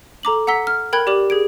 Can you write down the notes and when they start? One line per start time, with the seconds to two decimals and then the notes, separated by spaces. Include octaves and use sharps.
0.23 A4 A#5 D6 F#7
0.47 F#5 A#5 E6 B6 G7
0.67 F6
0.93 A#4 G5 B5 F#6 G#6
1.07 G4 D5 D6 F#7
1.30 G#4 G#6 D7